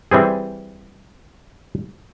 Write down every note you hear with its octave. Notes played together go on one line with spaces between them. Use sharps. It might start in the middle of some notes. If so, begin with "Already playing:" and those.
E3 G3 C4 G#4